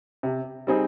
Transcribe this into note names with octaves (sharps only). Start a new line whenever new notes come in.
C3
G3 C4 D#4 G#4